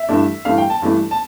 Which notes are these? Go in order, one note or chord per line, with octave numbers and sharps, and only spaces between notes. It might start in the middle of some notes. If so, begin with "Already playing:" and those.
Already playing: E5
G2 E3 A3 D4
G2 E3 A3 D4 F5
G5
A5
G2 E3 A3 D4
A5